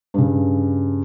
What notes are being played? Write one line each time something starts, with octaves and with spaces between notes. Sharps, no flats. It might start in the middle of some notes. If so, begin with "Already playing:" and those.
G2 C#3